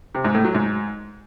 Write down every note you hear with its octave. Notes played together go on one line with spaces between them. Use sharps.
C3
G#2
A2
F#3
G#2